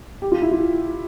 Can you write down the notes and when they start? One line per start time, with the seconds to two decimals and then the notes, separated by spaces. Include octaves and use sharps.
0.22 G4
0.32 F4
0.42 E4
0.52 F4